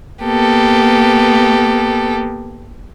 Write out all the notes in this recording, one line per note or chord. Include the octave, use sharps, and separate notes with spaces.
A#3 B3 G4 A4